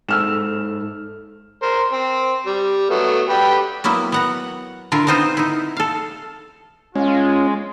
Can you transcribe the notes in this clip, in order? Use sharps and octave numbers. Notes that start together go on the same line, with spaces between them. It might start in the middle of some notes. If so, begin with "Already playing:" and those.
G#2 A4 E6 F6 E7
A#4 C5
C4
G3
F#3 A3 B3
G4 B4 G5
F#3 A#3 B3 E4
B3 F#5 A#5
D3 E4 F4 A#4
B3 C4 D#4 F4 C5
D#4 E4
A4 F5
G#3 C#4 F4